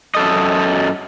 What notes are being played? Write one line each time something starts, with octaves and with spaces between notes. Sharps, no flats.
F#2 A4 D#5